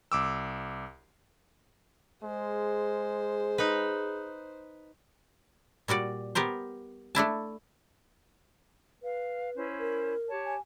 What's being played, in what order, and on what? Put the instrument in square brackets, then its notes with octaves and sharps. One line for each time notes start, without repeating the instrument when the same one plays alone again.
[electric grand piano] C2 D6 E6
[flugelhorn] G#3 [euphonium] G#4 [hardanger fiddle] C5
[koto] D#4 B4
A#2 G3 F#4 D5
B3 G4 A#4 C5
A3 D4 E4 A5
[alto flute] B4 [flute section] F5
[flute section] C#4 E4 C5
[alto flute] A#4
[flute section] G4 C#5 A5
[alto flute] G#5